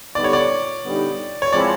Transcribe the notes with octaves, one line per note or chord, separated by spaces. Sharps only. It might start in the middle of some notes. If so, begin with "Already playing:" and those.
D3 G3 B3 D#4 D5
C#5
D5
D3 G3 B3 D#4
C#5
F3 G#3 C4 E4 D5